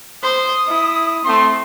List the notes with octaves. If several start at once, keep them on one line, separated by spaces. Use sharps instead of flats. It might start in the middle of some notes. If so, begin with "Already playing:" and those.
C5 D#6
E4
A3 C4 C6